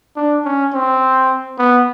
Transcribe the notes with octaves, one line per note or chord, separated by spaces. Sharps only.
D4
C#4
C4
B3